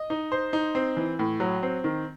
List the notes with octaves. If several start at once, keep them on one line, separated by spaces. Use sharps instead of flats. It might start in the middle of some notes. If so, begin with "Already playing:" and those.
Already playing: D#5
D#4
C5
D#4
C4
E3
A2
F#3
C4
D#3